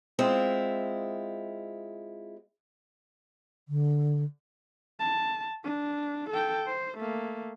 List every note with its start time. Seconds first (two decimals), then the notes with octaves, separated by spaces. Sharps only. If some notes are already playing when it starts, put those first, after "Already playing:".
0.19 G#3 C4 E4 F4
3.69 D3
4.99 A5
5.64 D4
6.30 A4 G5
6.66 C5
6.98 A3 A#3